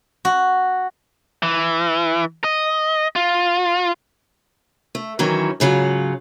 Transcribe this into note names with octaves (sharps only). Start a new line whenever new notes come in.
F#4
E3
D#5
F4
A3
D#3 E3 F#3 C#4
G#2 C#3 F#3 F4